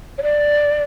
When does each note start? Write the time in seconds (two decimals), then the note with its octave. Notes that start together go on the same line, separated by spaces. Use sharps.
0.18 C#5
0.22 D5